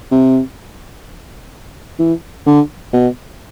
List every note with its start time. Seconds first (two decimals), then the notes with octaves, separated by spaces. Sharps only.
0.11 C3
1.99 E3
2.46 D3
2.93 B2